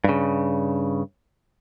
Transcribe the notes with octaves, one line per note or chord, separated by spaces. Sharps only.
G2 C#3